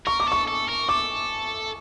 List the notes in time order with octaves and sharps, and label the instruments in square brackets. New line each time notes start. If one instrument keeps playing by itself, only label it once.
[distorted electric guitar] A#4 [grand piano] C#6
[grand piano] D6
[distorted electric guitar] A4 [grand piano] C#6
[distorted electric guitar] A4
A#4
[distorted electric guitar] A4 [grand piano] D6